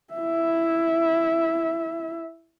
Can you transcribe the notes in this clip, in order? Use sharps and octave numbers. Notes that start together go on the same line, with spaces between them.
E4 E5